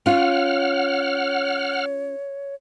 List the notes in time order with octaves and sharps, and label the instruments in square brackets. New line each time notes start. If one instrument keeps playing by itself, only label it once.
[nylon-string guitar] C#4 F4 [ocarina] C#5 [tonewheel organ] F#5 F6